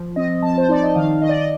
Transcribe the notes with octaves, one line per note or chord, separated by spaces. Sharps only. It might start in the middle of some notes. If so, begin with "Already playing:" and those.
Already playing: F3
C4 D#5
F3 A5
C5
D#4 D5
D#5
D#3 F5
D#3 D#5
D5
D#5